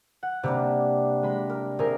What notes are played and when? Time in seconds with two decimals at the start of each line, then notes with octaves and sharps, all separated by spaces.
0.23 F#5
0.43 C3 G3 A#3 D4
1.23 G#3 B5
1.50 A#4
1.79 C3 G#4 A#4